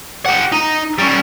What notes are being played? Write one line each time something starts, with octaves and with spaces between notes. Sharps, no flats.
G4 F#5
D#4
G3 C#4